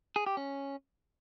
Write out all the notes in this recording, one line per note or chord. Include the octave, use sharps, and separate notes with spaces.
G#4
G4
C#4